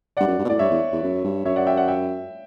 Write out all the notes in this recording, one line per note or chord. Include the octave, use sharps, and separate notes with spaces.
G2 D5 F#5
F#2
G2
B2
A2 D5
G2 C#5 E5
E2
E2
F#2
G2
F#2 C#5 E5
D5 F#5
E5 G5
D5 F#5
E5 G5